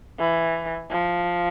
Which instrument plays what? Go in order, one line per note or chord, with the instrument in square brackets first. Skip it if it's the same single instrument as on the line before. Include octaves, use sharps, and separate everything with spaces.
[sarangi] E3
F3